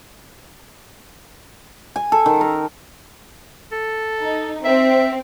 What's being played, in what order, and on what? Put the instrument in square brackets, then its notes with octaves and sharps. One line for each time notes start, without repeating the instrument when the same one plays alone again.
[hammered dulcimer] G#5
A4
D#3
A#4
[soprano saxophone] A4
[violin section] D#4
[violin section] C4 [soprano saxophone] E5